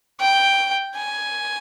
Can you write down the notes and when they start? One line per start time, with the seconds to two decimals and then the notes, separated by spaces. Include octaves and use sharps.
0.20 G5
0.96 G#5